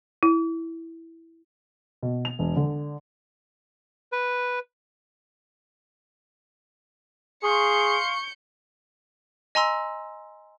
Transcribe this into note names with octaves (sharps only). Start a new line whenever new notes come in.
E4
B2
F7
E1
D3
B4
G#4 F5 C6 C#6 G6 C#7
D#5 G#5 A#5 C6 E6